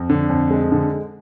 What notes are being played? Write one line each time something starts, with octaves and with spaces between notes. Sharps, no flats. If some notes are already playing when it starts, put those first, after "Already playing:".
Already playing: F2
D3
F2
G#3
D3